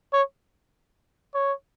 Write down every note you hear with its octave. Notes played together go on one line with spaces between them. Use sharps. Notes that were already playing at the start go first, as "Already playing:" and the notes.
C#5
C#5